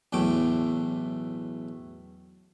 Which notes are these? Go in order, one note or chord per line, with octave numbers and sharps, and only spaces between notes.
B1 E2 A2 A3 D6